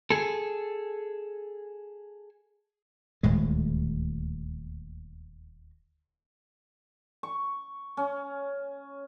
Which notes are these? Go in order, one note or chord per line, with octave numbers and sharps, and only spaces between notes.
G#4 A4
D#1 D2 A2 G#3
C#6
C#4